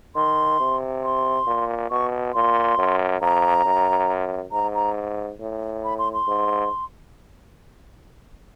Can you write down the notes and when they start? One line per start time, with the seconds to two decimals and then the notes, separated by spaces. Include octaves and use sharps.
0.16 D#3 C6
0.60 C3
1.04 C6
1.47 A#2
1.90 B2 C#6
2.34 A#2 C6
2.78 F#2
3.21 F2 A#5
3.65 F#2
4.52 G#2 A#5
4.75 A#5
5.40 A2
5.84 B5
5.99 C6
6.13 C6
6.28 G#2